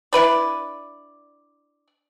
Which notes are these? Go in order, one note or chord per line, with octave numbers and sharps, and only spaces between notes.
D4 E4 B4 D5